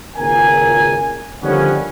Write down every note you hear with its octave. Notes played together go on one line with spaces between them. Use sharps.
G#1 C#2 A#2 A#4 G#5
D3 D#3 F3 G3 B3 C#4